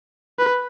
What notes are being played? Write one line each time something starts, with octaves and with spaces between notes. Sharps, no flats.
B4